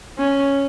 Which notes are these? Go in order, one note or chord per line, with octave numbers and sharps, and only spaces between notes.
C#4